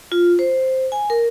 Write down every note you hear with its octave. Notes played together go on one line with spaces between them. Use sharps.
F4
C5
G#5
A#4